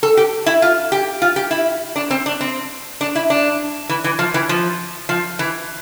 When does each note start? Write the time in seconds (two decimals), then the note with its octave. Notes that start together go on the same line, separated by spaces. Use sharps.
0.03 A4
0.17 G4
0.46 E4
0.62 F4
0.92 G4
1.22 F4
1.36 G4
1.51 E4
1.96 D4
2.11 C4
2.26 D4
2.41 C4
3.01 D4
3.15 E4
3.30 D4
3.89 E3
4.04 E3
4.19 F3
4.34 E3
4.49 F3
5.09 F3
5.39 E3